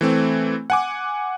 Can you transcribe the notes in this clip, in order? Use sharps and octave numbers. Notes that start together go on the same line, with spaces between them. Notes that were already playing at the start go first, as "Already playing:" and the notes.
E3 A3 C4
F#5 G#5 D6